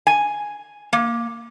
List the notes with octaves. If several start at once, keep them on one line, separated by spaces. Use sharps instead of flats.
G#5
A#3